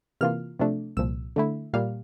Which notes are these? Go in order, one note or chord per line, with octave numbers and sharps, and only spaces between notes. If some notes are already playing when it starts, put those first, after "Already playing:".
C3 E3 A#3 F4 F6
C3 F3 A3 D4
C2 A#2 F3 E6
D3 A3 E4
A#2 G3 A#3 F5